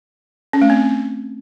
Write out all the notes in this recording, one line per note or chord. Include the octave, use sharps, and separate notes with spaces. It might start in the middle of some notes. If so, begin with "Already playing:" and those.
C#4
A3
C4